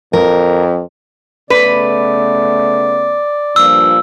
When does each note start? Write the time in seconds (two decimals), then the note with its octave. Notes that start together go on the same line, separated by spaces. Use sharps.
0.13 F2 A#4
1.50 C#3 A3 B3 B4 D5
3.56 G2 A#2 F3 E6